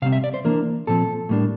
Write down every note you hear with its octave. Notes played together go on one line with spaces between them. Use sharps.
C3 G3 C4 F5
E5
D5
C5
E3 A#3 D4 A#4
A#2 F3 C4 A4
A2 G3 A#3 D4